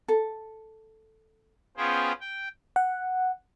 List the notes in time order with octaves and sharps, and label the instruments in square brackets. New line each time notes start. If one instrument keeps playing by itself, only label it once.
[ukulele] A4
[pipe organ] B3 C#4 F4 G#4 C5 G5
G5
[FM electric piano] F#5